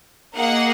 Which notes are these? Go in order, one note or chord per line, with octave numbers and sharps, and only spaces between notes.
A#3 D#4 G#4 F#5